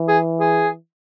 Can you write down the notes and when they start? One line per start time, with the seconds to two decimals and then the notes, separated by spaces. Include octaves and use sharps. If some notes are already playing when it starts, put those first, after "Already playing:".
Already playing: E3
0.09 G#4
0.40 G#4